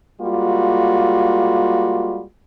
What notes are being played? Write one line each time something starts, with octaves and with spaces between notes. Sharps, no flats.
G3 G#3 A#3 F4 F#4